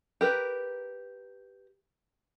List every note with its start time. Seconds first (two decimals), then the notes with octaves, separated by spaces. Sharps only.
0.21 G4 A#4 B4